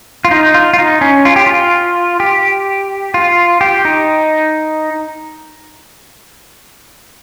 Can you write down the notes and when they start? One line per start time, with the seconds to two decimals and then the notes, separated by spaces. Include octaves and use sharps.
0.25 F4
0.31 D#4
0.54 F4
0.73 F4
0.78 D#4
1.01 C#4
1.25 F4
1.36 G4
1.46 F4
2.20 G4
3.14 F4
3.61 G4
3.85 D#4